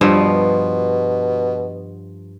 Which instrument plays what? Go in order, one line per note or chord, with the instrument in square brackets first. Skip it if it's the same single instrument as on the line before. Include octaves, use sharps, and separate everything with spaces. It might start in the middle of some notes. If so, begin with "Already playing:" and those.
[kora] G2 F3 [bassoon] B2